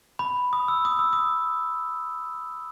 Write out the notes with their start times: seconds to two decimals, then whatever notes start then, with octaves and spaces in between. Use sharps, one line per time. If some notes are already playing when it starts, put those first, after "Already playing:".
0.19 B5
0.53 D#6
0.68 E6
0.85 D#6
0.99 E6
1.13 D#6